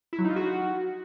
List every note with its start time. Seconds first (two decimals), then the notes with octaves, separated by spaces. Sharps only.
0.13 E4
0.19 F#3
0.24 D#4
0.30 F4
0.36 F#4